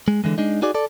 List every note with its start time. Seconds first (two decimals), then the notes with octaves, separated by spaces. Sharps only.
0.08 G#3
0.24 D3 E3 G#3
0.38 G#3 D4 D#4
0.62 D#4 F#4 G#4 D5
0.75 A4 D5